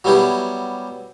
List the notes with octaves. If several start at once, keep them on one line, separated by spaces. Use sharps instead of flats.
F#3 G3 B3 E4 G4 G#4